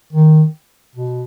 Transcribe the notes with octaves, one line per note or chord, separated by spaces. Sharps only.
D#3
B2